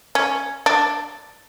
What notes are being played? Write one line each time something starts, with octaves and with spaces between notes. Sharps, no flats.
C#4
D4